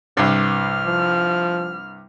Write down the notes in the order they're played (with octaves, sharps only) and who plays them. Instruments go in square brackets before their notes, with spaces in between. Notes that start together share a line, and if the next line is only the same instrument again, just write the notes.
[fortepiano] C2 G2 [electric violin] F6
[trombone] F3